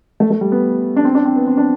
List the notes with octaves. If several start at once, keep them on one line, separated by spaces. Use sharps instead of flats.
A3
A3
G3
B3
D4
C4
D4
C4
B3
C4
D4